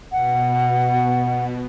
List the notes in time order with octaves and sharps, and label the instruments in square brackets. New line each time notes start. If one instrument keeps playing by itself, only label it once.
[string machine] B2 [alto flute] F#5